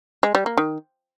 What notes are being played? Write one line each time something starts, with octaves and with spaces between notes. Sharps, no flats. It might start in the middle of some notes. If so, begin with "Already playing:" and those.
G#3
G3
A#3
D#3